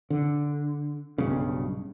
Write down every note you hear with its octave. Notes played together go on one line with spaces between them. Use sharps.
D3
B1 G2 C#3